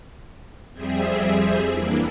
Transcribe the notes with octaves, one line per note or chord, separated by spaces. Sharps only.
F2 G3 C4 G#4 E5
E3 A#3 D4 E4